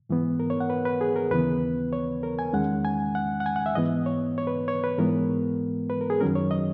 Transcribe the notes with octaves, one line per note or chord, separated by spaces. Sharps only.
G#2 E3 B3
A#4
C#5
F#5
B4
B4
G#4
A#4
D#2 C#3 E3 B3 B4
C#5
A#4
G#5
E2 D#3 G#3 C#4 F#5
G#5
F#5
F#5
G#5
F#5
E5
G#2 E3 B3 D#5
C#5
C#5
B4
C#5
B4
G#2 E3 G#3 B3 A#4
B4
A#4
G#4
F#2 D#3 F#3 C#4 A#4
C#5
D#5